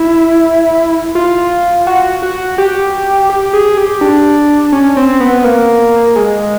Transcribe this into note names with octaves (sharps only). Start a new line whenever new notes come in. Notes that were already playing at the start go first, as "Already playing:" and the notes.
Already playing: E4
F4
F#4
F#4
G4
G4
G#4
G4
D4
C#4
C4
B3
A#3
G#3